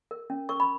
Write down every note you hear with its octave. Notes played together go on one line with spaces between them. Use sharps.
A#4
C#4
A#4 C#6
B5